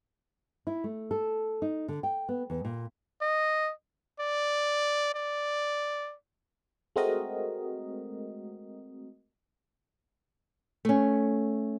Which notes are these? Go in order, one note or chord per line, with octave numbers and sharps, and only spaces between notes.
E4
A3
A4
D#4
D3
G5
B3
E2
A#2
D#5
D5
D5
G#3 A3 C4 F#4 A#4 D#5
A3 C#4